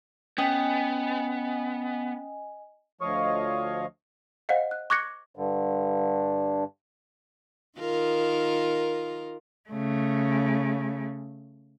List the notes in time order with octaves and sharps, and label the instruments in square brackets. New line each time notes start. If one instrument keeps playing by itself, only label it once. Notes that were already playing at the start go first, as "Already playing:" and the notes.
[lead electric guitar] B3 [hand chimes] C#4 G5 D#6 [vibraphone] D#5 G#5
[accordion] D2 F3 C#5 D#5 F5 C#6
[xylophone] C5 D#5 F5 F#5
F#6
C#6 D6 F#6 G#6 A#6 C#7
[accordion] G2 D3
[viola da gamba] D#3 F4 A#4
[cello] C#3 A3